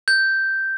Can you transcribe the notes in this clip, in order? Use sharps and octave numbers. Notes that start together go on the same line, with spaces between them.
G6